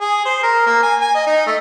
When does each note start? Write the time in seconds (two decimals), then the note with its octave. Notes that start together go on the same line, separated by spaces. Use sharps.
0.01 G#4
0.25 C5
0.43 A#4
0.67 A#3
0.83 G#5
1.01 G#5
1.15 D#5
1.27 D#4
1.47 A3